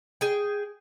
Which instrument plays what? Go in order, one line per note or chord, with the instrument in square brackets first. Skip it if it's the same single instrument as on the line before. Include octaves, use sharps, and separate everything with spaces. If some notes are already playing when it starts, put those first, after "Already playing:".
[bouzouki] G#4 G5